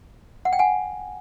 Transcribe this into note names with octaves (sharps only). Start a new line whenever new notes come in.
F#5
G5
F#5 G#5